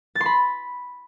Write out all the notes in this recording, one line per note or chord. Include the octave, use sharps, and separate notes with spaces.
A6
C6
B5